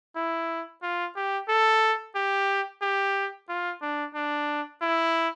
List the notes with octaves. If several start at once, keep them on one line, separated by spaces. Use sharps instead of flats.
E4
F4
G4
A4
G4
G4
F4
D4
D4
E4